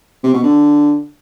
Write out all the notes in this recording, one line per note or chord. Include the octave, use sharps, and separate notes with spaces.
C3
B2
D3